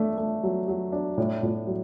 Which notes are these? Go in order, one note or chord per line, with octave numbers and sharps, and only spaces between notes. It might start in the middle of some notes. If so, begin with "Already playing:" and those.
Already playing: A3 D4
A3
F#3
F#3
D4
A2
A2
F#3